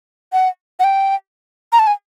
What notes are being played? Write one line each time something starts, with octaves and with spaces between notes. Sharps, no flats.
F#5
F#5
G5
A#5
A5
G#5